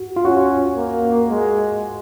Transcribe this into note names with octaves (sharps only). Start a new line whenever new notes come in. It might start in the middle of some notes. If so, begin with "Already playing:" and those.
Already playing: F#4
F4
C#4 F#4
A#3
G#3